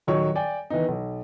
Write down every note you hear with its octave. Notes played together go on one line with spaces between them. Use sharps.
D#1 D#3 F#3 C#5 C#6
D5 G5 G#5
D#3 E3 B3 D#4
B1